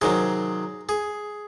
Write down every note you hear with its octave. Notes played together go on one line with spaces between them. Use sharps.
C3 D#3 F#3 G#4
G#4